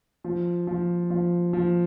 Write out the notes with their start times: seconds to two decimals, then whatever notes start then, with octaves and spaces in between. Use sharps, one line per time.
0.24 F3
0.67 F3
1.10 F3
1.53 F3